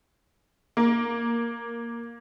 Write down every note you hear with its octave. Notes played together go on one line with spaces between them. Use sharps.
A#3